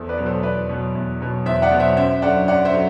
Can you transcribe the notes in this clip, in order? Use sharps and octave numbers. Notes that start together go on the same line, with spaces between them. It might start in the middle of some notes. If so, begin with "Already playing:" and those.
Already playing: E2 A4 C5
B4 D5
B2 F#3
A4 C5
E2 B4 D5
B2 F#3
E2
B2 F#3
E2 C5 E5
D5 F#5
B2 F#3
C5 E5
F#2 C5 E5
D3 F#3 D5 F#5
F#2 D5 F#5
C5 E5
D3 F#3